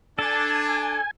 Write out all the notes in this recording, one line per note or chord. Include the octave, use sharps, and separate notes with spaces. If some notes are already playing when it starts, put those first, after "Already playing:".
D4 A4 G#5